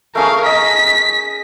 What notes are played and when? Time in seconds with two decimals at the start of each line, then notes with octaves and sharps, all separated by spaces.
0.15 A3 C#4 G#4 A#4 F5
0.46 D#5 A#5 B6